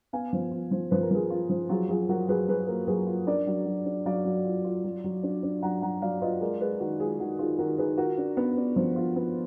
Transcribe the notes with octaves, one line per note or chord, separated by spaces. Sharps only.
B3 F5 G#5
F3
F4
F3
F3 B4
A#4
F3 G#4 B4
F4
F3
F#3 F4 G#4
F#3 F4 G#4
F#3 F#4 A#4
F#3 G#4 B4
F#3 G#4 B4
A#3
F#3 G#4 B4
F4
D4 A#4 D5
F#3
F#3
D4
F#3 D5 F5
F#3
F4
F4
F#3
F#3
D4
D4
F#3 F#5 A#5
F#3 F#5 A#5
F#3 D5 F5
F4 B4 D#5
G#3 A#4 D5
G#3 G#4 B4
D#3 F#4
G#3 F4 G#4
D#3 F#4
D#3 F4 G#4
D#3 F#4 A#4
D#3 G#4 B4
F4 F#4 A#4
D4
B3
D4
F3
F4
B3